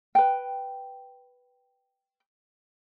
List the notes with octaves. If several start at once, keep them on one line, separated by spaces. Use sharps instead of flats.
B4 G5